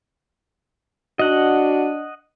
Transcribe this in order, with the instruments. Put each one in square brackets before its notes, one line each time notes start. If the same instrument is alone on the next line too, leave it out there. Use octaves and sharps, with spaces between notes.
[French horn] D4 [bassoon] F#4 [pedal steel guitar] D#5 F#5